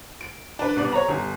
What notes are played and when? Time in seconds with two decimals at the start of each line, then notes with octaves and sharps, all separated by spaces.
0.21 D7
0.59 D4 B4
0.76 C2 B3 D5
0.92 C#5 A#5
1.09 G1